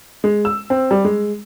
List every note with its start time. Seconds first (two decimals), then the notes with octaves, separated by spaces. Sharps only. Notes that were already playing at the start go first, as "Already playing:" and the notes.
0.24 G#3
0.45 E6
0.70 C4
0.91 G3
1.05 G#3